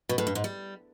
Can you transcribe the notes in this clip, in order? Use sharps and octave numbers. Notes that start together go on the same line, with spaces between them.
B2
A2
G2
G#2
G3